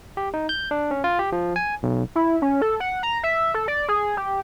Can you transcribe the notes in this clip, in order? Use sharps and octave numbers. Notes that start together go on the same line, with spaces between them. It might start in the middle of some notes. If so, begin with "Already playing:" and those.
G4
D#4
G6
D4
C#4
F4
G4
F3
G#5
B1
E4
C#4
A4
F#5
A#5
E5
A4
D5
G#4
G4